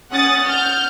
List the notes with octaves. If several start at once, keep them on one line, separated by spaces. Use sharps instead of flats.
C#4 F#5 D#6 A6
F6 G6